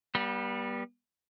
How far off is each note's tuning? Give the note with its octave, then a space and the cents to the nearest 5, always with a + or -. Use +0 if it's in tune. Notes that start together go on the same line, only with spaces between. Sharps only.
G3 +0 B3 -35